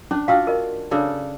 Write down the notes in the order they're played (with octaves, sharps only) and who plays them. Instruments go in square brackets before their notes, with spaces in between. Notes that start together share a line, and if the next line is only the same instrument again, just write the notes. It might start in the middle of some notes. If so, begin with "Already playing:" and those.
[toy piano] C#4 [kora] D4
[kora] D4 F4 F#4 [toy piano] F5 G5 E6
[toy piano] A#4 D#5
[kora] C#3 D4 A4 [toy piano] D5